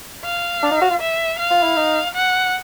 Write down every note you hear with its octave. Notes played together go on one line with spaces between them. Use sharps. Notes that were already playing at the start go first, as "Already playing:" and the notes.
F5
D4
D#4
F#4
F4
E5
F5
F4
E4
D#4
F#5